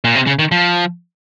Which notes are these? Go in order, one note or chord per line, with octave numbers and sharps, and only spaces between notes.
A#2
C3
C#3
D#3
F3